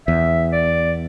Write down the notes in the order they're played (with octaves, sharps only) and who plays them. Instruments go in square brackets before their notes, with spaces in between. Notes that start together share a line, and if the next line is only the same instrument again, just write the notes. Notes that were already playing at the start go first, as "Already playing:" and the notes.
[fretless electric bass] E2 [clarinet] E5
[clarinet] D5